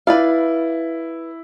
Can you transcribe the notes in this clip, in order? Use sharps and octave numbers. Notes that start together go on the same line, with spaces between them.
E4 B4 D5 F5